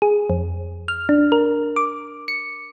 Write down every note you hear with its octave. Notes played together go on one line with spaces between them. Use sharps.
G#4
F2
F6
D4
A#4
D6
C#7